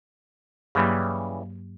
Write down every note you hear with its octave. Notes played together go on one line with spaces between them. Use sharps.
G2 C#3 E3 F#3 G3 A#3